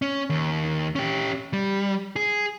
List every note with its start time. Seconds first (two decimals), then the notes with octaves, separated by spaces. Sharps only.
0.02 C#4
0.30 D#2
0.95 C#4 G4
1.53 G3
2.16 G#4